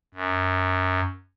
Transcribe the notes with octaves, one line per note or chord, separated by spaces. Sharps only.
F#2